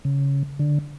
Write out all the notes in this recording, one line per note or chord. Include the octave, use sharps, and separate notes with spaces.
C#3
D3